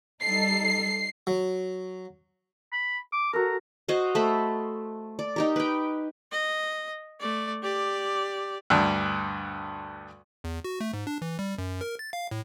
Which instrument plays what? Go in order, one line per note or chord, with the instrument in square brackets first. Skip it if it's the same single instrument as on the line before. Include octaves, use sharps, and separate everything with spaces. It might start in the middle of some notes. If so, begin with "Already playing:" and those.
[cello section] G3 D#4 A4 [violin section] C7
[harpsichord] F#3
[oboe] B5
D6
[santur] F#4 A4 A#4 [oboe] A#5
[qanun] F#4 C5 D#5 F5
A3 A4 C5 B5
D5
D#4 G4 A#4
B4 G5
[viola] D#5
A3 D5
G4 D5
[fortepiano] D2 G2
[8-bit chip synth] E2
F#4
A3
G#2
D4
E3
G3
F#2
A#4
A6
F5
A2